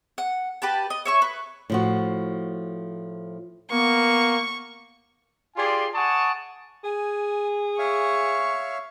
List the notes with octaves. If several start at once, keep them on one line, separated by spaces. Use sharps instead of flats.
F#5
G4 B4 A5
D#5
C#5 E5 C#6
B4
A2 F3 F#4
A#3 B3 C#6
F4 G4 G#4 D5 G#5 C6
D5 F#5 G#5 A5 C#6 D#6
G#4 G#5
C#5 E5 F5 C#6